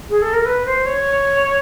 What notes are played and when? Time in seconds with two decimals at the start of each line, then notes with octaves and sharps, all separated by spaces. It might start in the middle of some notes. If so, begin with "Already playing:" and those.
0.10 G#4
0.22 A4
0.33 A#4
0.46 B4
0.66 C5
0.86 C#5